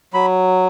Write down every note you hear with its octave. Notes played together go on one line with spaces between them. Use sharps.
F#3 B5